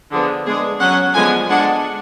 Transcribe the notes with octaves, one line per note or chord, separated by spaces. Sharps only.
D3 F3 B3 G#4
G#3 B3 D4 G#4
F#3 C#4 F#5
D3 F3 G#3 B3 G#5
G#3 D4 F#5